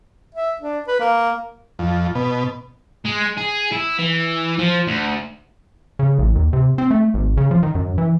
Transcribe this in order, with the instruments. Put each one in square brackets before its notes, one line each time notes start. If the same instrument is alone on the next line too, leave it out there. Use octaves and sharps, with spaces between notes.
[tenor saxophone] E5
D4
B4
A#3
[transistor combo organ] F2
B2
[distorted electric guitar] G#3
G#4
E4
E3
F3
D2
[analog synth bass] C#3
A1
D#2
C3
C4
A3
G#1
C#3
F3
D#3
F#2
E3